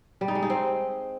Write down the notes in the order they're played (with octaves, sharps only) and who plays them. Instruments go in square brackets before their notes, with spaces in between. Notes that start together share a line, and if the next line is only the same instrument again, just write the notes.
[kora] G3
D#4
G#3
D#4
C4